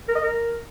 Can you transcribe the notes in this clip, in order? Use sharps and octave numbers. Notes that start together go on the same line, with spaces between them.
A#4
D#5
A#4